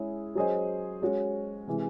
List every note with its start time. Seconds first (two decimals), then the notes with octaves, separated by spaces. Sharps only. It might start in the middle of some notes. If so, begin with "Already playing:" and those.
Already playing: G#3 C#4 E4 G#4
0.35 F#3 C#4 G#4 C5 D#5
1.02 G#3 C#4 F#4 C#5
1.67 C3 E3 G#3